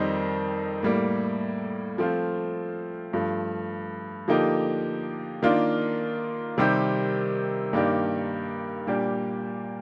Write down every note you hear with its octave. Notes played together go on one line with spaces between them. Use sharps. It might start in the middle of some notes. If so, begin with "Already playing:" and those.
Already playing: F2 D#3 G3 C4 D#4
A2 G3 A#3
F3 A3 C4 F4
G2 F3 A3
D3 F3 A#3 D#4 G4
D#3 A#3 D4 F4
C3 D#3 G3 C4 G4
G2 D#3 A#3 D4 G4
A#2 G3 A#3 D4 G4